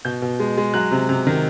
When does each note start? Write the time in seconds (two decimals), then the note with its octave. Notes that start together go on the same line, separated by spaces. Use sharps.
0.05 B2 G6
0.22 B2
0.40 G#3
0.57 G#3
0.74 F#3 F#6
0.91 C3
1.09 C3
1.27 D#3